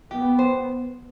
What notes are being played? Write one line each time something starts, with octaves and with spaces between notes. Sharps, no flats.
B3 G4
C5